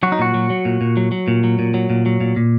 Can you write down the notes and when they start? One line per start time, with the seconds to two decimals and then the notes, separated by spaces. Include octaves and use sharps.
0.03 F#3 F#4
0.12 D#4
0.19 A#2 F#4
0.34 F#3
0.50 F#3
0.65 A#2
0.81 A#2
0.97 F#3
1.12 F#3
1.28 A#2
1.44 F#3
1.59 A#2
1.74 F#3
1.90 A#2
2.06 F#3
2.21 A#2
2.36 A#2